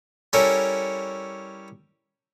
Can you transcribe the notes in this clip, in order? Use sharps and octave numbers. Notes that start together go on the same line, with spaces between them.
G3 C#4 E4 A4 A#4 C#5